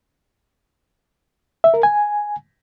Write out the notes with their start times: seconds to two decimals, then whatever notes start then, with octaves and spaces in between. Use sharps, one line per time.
1.64 E5
1.74 A#4
1.83 G#5